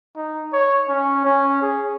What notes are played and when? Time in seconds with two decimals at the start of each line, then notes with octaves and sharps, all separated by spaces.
0.16 D#4
0.53 C#5
0.89 C#4
1.25 C#4
1.62 G#4